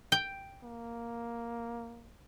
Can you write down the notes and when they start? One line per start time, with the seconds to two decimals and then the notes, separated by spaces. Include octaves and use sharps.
0.12 G5
0.63 A#3